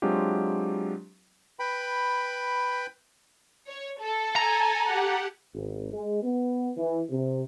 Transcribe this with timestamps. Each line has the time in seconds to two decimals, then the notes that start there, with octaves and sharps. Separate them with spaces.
0.02 F#3 G#3 C4 D4 F4 G4
1.60 B4 G5 B5
3.68 C#5
4.00 A4
4.36 G#5 A#5
4.84 G4 F#5
5.54 G#1
5.93 G#3
6.23 B3
6.77 E3
7.10 C3